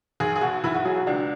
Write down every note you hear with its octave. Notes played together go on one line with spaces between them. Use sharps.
B1 G#4
G#4
B2 F#4
B1 E4
F#4
F#3 G#4
F#4
C#2 D4